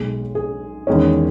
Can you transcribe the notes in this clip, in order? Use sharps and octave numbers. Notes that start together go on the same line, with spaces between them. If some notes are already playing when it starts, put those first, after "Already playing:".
Already playing: B1 B2 G#3
G#4
E2 D#3 G#3 C#4